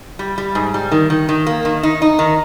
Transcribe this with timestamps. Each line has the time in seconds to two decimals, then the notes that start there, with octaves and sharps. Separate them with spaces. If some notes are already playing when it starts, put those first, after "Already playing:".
0.19 G3
0.38 G3
0.55 G#2
0.74 G3
0.91 D#3
1.10 D#3
1.29 D#3
1.46 A#3
1.65 D#3
1.83 D#4
2.02 D#4
2.19 D#3